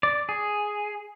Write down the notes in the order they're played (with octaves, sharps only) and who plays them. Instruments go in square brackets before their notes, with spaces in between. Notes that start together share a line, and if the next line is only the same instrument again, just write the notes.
[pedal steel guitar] D5
G#4